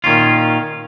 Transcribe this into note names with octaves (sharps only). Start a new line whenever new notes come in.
A#2 D#3 C#4 F4